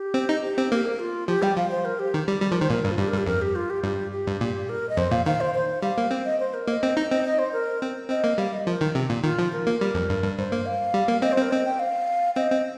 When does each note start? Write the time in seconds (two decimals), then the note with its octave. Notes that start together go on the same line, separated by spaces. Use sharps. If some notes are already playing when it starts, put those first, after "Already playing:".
Already playing: G4
0.14 C4
0.29 D#4
0.43 G4
0.58 C4
0.71 A#3 G4
0.86 A#4
0.99 F4
1.28 F3 G4
1.42 G3 G5
1.56 F3 F5
1.71 C5
1.85 A#4
1.99 G4
2.14 D#3
2.28 G3
2.42 G3 G4
2.51 F3 A#4
2.61 D#3 C5
2.70 A#2 A#4
2.85 G2
2.91 F4
2.98 G2 G4
3.08 A#4
3.12 G2
3.18 G4
3.27 F2 A#4
3.41 G4
3.55 F4
3.70 G4
3.83 G2 G4
4.12 G4
4.27 G2
4.41 A#2 G4
4.69 A#4
4.89 D#5
4.97 F2 C5
5.11 A#2 F5
5.26 D#3 F5
5.40 C5
5.54 C5
5.82 G3 F5
5.98 A#3
6.11 C4
6.25 D#5
6.40 C5
6.54 A#4
6.67 A#3 D#5
6.83 C4
6.97 D#4
7.11 C4 D#5
7.25 D#5
7.39 C5
7.53 A#4
7.81 C4
8.10 C4 D#5
8.24 A#3
8.38 G3 F5
8.53 D#5
8.67 F3 A#4
8.81 D#3
8.95 C3
9.10 A#2
9.24 D#3 F4
9.39 F3
9.53 A#4
9.67 A#3
9.81 G3
9.94 F2
10.10 G2
10.24 G2
10.37 G2 C5
10.52 A#3
10.66 F5
10.94 G3
11.08 A#3
11.22 C4 D#5
11.32 C5
11.37 C4 A#4
11.51 C4 D#5
11.65 G5
11.79 F5
12.36 C4 D#5
12.51 C4